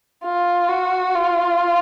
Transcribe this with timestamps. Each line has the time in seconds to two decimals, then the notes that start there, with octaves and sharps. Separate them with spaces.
0.24 F4
0.69 F#4
1.15 F4